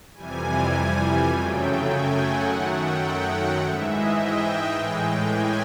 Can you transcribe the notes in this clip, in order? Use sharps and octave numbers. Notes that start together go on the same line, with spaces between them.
F2 C3 E3 G3 G#5
G#5
F#2 C#3 F#3 A3 G5
G#5
F#5
F#2 D#3 F#3 A3
G5
F#5
G#2 E3 G#3 E5
D#5
G5
A2 E3 G#3
G#5